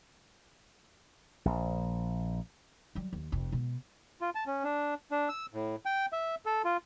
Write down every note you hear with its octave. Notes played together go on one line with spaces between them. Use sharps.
A#1
F#3 G3
D#2
F1 F2
B2 G#3
F4
A5
C#4
D4
D4
E6
A2
G5
E5
A4
F4